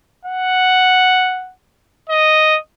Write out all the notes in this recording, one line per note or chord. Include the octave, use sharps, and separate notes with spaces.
F#5
D#5